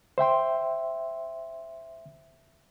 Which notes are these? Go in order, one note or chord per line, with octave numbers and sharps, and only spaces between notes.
C5 E5 G5 C6